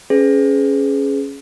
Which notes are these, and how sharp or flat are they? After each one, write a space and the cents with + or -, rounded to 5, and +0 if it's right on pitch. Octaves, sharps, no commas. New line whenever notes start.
C#4 +0 G#4 +15 B4 +35